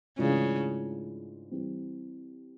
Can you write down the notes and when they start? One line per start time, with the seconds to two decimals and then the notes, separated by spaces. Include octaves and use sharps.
0.18 G#2 C#3 E3 A3 D4 F4
1.51 E3 G3 C4